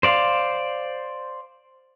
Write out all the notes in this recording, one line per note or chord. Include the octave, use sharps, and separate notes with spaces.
C5 D5 F5